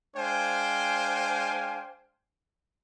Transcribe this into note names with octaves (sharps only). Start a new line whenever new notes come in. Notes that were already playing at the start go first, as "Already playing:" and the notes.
G#3 D4 C5 F5 G5 G#5